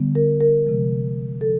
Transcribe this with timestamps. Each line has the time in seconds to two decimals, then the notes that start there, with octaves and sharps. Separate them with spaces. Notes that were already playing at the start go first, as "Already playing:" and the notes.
Already playing: D3 G3 B3
0.15 A#4
0.41 A#4
0.65 C3 F3 G#3
1.41 C3 F3 A4